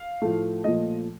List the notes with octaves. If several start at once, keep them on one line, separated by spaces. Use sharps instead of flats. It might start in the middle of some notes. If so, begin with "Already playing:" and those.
Already playing: F5
A2 F3 A3
A#2 F3 A3 D#5